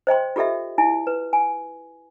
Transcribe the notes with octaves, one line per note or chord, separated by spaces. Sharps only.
C5 D#5 G5 C6
F4 G4 A4 D#5 E5
E4 G#5
B4
G#5